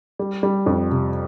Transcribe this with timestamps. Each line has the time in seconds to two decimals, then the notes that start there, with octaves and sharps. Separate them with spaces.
0.19 G3
0.43 G3
0.66 F2
0.91 C3